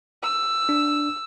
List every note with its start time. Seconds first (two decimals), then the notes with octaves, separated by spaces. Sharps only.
0.23 E6
0.69 D4